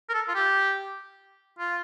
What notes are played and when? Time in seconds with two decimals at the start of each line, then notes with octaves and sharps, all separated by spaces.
0.09 A#4
0.14 A4
0.28 F4
0.35 G4
1.59 F4